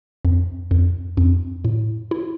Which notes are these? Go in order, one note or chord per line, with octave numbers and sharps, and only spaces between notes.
F2
F2
F2
A2
E4